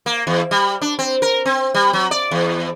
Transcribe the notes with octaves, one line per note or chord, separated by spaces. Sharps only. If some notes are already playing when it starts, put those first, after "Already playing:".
A#3
E2
G3
D4
C4
A#4
C4
G3
F#3
D5
E2